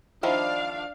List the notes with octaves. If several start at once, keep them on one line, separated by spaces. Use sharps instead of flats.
D#3 F3 D4 E4 F5